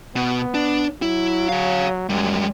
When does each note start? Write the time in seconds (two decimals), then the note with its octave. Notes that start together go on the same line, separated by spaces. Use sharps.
0.16 B2 B3
0.54 D4
1.02 F#3 E4
1.49 C#5 F5
2.09 F#2 G3 G#3